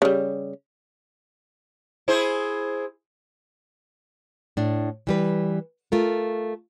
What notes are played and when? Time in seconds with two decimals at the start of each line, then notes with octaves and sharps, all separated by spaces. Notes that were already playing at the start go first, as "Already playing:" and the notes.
0.02 C#3 G3
2.08 E4 G#4 C5
4.57 A2 D4
5.07 E3 G3 B4
5.92 A3 F4 A#4